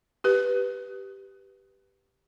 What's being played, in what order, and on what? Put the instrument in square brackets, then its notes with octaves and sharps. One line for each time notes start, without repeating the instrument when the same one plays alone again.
[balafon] G4 B4